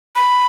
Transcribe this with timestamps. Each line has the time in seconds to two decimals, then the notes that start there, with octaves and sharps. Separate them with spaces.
0.16 B5